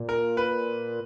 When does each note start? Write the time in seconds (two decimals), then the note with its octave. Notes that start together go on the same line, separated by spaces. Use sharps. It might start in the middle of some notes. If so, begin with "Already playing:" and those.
Already playing: A#2
0.09 A#4
0.37 B4